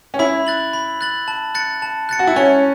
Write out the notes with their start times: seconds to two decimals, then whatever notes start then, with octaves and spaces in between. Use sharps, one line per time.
0.14 C#4
0.19 E4 B5
0.47 F#6 A6 F#7
0.73 B5
1.01 F#6 A6 F#7
1.28 A5
1.55 F#6 A6 C#7
1.82 A5
2.09 F#6 A6 C#7
2.19 F#4
2.27 E4
2.36 C#4 C#6